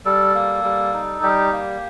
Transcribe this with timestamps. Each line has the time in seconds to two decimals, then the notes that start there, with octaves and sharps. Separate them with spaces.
0.05 G3 A4
0.35 A#3
0.64 G3
0.93 D#4
1.23 G3 G4
1.52 A#3